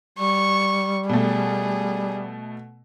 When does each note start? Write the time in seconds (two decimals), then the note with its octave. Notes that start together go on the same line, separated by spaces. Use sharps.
0.19 G3 C#6
1.09 B2 A3 G#4